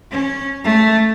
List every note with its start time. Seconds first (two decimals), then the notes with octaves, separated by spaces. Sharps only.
0.11 C#4
0.64 A3